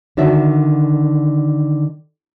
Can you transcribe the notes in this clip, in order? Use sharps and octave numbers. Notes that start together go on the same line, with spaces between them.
D3 D#3 F#4 D5 E5